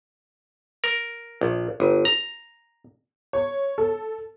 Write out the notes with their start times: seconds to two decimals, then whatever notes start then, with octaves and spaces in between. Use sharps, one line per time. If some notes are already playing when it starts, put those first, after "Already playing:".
0.84 A#4
1.41 A#1
1.80 G1
2.05 A#5
3.33 C#5
3.78 A4